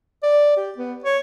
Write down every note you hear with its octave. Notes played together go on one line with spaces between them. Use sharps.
D5
G4
B3
C#5